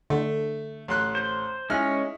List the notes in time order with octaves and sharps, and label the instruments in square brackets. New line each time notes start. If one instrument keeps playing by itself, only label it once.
[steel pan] D3 [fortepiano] A3
[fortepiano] A1 C6 F#6
[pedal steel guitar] C5
[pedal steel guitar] G#3 C#4 [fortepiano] D#4 E4 F6